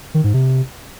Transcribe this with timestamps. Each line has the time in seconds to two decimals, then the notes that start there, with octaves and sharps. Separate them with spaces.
0.14 D#3
0.24 G#2
0.34 C3